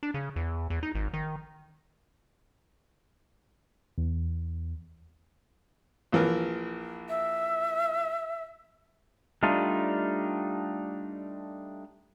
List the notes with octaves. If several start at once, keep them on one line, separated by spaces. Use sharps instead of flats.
D4
C#3
E2
E2
D#4
G#1
D#3
E2
A#1 E3 A#4
E5
G3 A3 D4 D#4 F4